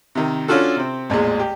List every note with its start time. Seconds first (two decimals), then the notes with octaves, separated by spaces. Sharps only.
0.15 C3 D#3
0.48 C#4 D4 F4 F#4 A4
0.77 C3 C4
1.10 A1 E2 A#2 G#3
1.39 G4